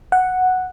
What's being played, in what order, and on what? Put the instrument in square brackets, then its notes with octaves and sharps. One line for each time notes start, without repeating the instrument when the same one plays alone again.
[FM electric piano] F#5